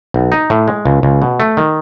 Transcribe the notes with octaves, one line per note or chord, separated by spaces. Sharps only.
B1
D#4
A2
G#3
C#2
C#2
B2
A3
D#3